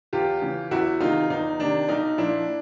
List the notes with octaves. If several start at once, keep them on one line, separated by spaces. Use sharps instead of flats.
E2 F4 G4
C#3 E3
E2 E4 F#4
C3 D#3 D#4 F4
E2 D#4
C3 D#3 D4
B1 D#4
A#2 F3 D4 E4